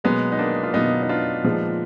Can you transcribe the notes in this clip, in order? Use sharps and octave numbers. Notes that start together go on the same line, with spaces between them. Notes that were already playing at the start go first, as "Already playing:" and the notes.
B2 F#3 G#3 A#3 B3
D#4
A#3 D4
F4
B2 F#3 A#3 B3 D#4
D#4
D4 F4
A#2 F3 G#3 D#4